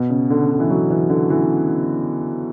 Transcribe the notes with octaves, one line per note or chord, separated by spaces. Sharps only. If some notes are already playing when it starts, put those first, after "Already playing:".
Already playing: B2
C#3
D3
C#3
D3
E3
F#3
E3
D3
E3